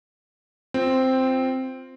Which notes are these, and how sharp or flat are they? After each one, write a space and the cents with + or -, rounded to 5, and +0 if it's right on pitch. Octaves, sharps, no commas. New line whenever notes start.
C4 +0 F4 +0